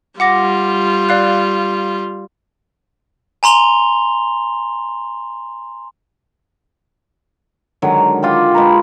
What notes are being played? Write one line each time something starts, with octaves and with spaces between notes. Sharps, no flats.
G3 F4 F#5 D6 A#6
D5 F5 F#6
G#5 A#5 C6 F7 G7
D3 D#3 F#3 G#3
F4 G4 G5
G#3 B4 A#5